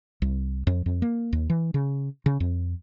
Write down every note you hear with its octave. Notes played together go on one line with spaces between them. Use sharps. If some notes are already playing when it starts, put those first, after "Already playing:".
C2
F2
F2
A#3
D#2
E3
C#3
C#3
F2